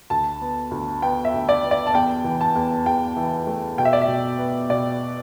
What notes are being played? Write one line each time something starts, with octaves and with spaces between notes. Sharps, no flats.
D2 A5
B3
D2
B3 G5
E5
D2
D5
B3
D5
A5
E2 G5
E3
A5
E2
E2 G5
E3
A3
B2 G5
E5
D5
E5
B2
B3
B2 D5